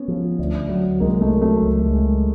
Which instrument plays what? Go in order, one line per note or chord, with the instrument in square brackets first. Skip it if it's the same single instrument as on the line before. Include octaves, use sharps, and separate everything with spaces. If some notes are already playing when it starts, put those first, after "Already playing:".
Already playing: [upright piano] B3 C#4
[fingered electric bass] F3
D2
F#3
[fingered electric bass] C2 [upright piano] G#3 A#3
[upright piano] A3
[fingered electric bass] F#3
[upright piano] A3
[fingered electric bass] C#2
G#3